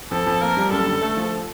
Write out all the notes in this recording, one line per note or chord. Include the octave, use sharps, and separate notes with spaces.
F2 A4
F2
A#3 A#4
G3
F#2 A4
D3
A3
F3